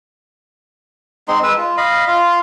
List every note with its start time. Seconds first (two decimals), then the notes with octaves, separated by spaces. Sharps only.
1.28 G#3 C4 D#4 C6
1.44 G#3 B4 E6
1.57 F4
1.77 D#5 F5 B5
2.07 F4 F5